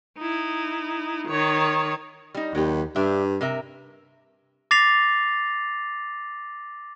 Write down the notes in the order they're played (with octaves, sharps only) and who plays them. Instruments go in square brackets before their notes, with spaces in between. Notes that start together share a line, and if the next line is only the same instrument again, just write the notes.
[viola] D#4 E4
D#3 C#5
[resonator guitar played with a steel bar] G3 D#4
[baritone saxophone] D#2 [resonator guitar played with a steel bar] F#3 G4
[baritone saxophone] G2 [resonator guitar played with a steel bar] D4 G4 E5
[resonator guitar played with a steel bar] C3 A#4 E5
[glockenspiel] D6 A6 A#6 C7 F7